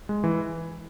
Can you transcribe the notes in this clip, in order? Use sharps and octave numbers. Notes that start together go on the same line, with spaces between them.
G#3
E3